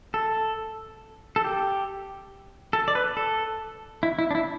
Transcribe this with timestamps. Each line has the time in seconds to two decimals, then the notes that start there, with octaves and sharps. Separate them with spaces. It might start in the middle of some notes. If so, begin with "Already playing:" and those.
0.14 A4
1.36 A4
1.44 G4
2.73 A4
2.88 D5
2.95 B4
3.17 A4
4.03 E4
4.19 E4
4.31 D4
4.35 E4